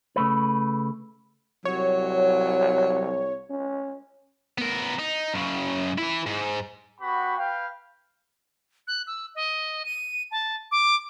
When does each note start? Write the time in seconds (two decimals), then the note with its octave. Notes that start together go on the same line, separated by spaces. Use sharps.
0.16 C#3 A3 B4
1.65 C2 F#3 C#5
3.50 C#4
4.58 B3 A#4
4.99 D#4
5.34 F#2 C#3
5.98 E3 E4
6.26 G#2
7.00 B3 F#4 G4 B5
7.37 B4 F5 G5
8.87 F#6
9.07 E6
9.35 D#5
9.85 D#7
10.31 A5
10.71 D6